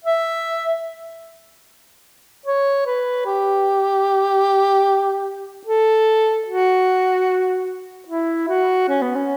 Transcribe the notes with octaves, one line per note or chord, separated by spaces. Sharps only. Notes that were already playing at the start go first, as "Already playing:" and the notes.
E5
C#5
B4
G4
A4
F#4
E4
F#4
C#4
B3
C#4